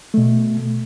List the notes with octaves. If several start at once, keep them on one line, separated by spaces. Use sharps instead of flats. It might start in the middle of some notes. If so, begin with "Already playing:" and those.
B2 A3